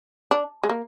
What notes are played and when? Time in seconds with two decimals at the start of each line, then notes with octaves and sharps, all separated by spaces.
0.31 D4
0.63 G#3
0.69 A#3